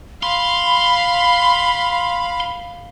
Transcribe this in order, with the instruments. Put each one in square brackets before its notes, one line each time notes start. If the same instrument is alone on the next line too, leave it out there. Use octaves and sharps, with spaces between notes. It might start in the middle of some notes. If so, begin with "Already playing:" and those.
[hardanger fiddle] F5 [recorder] B5 [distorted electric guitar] C6